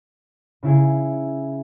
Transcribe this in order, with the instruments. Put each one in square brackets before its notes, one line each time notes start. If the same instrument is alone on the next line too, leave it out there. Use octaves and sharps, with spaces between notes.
[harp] C#3 E4 G#4